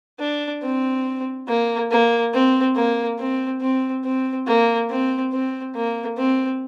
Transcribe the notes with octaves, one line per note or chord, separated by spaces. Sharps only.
D4
C4
A#3
A#3
C4
A#3
C4
C4
C4
A#3
C4
C4
A#3
C4